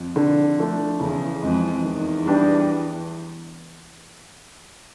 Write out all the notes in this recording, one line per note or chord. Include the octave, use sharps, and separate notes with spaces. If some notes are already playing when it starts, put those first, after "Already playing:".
Already playing: F2
D3
F3 A3 D4
E2 C#3
F2 E3 G#3
E2 D#3
G3 B3 D4 G4